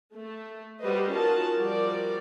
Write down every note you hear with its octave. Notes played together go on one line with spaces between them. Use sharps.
A3
G3 F#4 B4 C5 D#5
C#4 D#4 F4 F#4 A#4 A5
F3 G3 F#4 A#4 D5